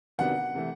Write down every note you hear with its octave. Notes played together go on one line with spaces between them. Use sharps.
C3 D#3 F#3 B3 D4 F#5
C3 E3 A3